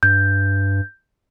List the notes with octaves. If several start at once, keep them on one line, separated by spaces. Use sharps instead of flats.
G2 G6